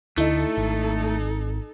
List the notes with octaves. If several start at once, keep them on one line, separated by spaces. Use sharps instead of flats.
D2 D3 A3 D#4 E4 A4 D#5
G#1